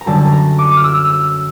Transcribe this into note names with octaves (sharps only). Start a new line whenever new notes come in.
A#5
F#2 D3 G3 A5
A#5
D6
F6
E6
E6